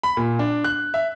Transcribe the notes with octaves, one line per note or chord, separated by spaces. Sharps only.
B5
A#2
D4
F#6
E5